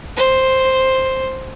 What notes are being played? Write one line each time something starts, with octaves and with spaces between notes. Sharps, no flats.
C5